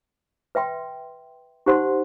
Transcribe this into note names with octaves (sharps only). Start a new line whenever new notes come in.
B4 E5 G5 C6
D#4 G4 C5 F#5 C6